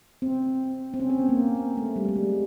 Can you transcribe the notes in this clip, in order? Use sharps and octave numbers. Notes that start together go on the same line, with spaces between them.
C4
C4
C#4
C4
B3
A#3
A3
G3
G3
G#3